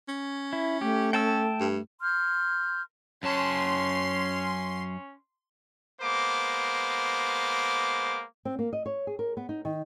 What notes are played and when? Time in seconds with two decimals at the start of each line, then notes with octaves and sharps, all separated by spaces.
0.08 C#4
0.53 E4
0.81 A3 G4
1.13 C#4 G5 A5 E6
1.60 G2
2.01 C6 F6 G6
3.23 F#2 C#4 A5 C6
6.01 G#3 A#3 B3 C5 D6
8.45 C4
8.59 A#3
8.73 D#5
8.86 C#5
9.07 G#4
9.19 A#4
9.37 B3
9.49 D#4
9.65 D#3